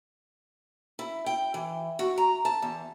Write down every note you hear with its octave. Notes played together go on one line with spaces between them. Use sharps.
E4
G5
E3
F#4
A#5
A5
E2